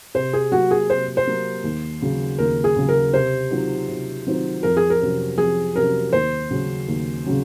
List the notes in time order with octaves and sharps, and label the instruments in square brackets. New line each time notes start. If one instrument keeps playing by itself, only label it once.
[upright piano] C3 [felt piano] C5
[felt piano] G#4
[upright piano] F#3 A#3 [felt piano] F#4
[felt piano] G#4
[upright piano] C3 [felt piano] C5
[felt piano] C5
[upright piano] F#3 A#3
D#2
C#3 F#3
[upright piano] D#2 [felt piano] A#4
[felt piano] G#4
[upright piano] C#3 F#3
[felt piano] A#4
[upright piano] C3 [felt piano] C5
[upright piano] D#3 F#3 C4 F4
C3
D#3 F#3 C4 F4
[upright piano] F2 [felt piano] A#4
[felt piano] G#4
A#4
[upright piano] C3 F#3 C#4
[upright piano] F2 [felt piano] G#4
[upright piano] C3 F#3 C#4 [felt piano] A#4
[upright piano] D#2 [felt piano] C5
[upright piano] C#3 F#3 C#4
D#2
C#3 F#3 C#4